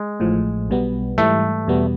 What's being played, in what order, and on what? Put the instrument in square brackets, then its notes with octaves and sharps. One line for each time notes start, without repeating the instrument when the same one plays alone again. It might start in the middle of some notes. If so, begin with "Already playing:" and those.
Already playing: [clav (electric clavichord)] G#3
[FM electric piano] A1 A2 F3
B1 B2 G3 B3
[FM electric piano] G#2 E3 G3 [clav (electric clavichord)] A3
[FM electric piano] E2 B2 G3 B3